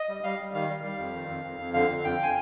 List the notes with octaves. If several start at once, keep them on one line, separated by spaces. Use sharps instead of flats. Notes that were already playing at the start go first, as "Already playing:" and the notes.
Already playing: D#5
G3
G3 F5
G3
D#3 F5
G3
G3
F2
D#3
F2
F2
F2
D3 F5
F2
F2 G5
G#5